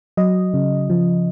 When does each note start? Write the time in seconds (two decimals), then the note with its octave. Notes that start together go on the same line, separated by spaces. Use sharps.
0.17 F#3 D#5
0.54 C#3
0.90 F3